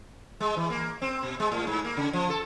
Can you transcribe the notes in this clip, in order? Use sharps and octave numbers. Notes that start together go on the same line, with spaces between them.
G#3
E3
A#3
C4
B2
G#3
A2
G#2
A#3
C#3
F3
A4